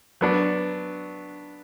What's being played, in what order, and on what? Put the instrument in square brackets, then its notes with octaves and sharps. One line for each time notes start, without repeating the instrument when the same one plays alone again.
[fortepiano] F#3 B3 D4